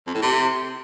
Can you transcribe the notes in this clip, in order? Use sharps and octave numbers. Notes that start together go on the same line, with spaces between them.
F2
A2
C3